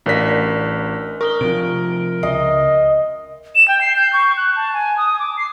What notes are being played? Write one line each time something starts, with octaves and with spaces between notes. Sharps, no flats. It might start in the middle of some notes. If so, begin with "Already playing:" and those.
A1 D4 A#4 D5 B6
A#4 C#6 D#6 G7
C3 F3 D7
C#2 D#5 E5 C6
E7
G5
C7
G6
C#6
F#6
A5
G#5
D#6
D6
C7